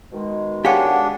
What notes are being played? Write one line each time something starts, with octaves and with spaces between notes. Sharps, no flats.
B2 D#3 G#3
D4 G4 G#4 C#5 F5 F#5 G#5